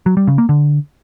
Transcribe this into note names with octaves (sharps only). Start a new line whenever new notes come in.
F#3
G3
C#3
A#3
D3